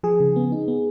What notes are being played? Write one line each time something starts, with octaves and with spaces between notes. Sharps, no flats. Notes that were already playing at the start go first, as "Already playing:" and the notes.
F3 G#4
C#3
B3
D#4
B3